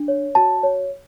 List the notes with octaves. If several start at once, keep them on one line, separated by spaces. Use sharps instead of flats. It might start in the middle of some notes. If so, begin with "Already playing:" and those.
Already playing: D4
C#5
F#4 A5
C#5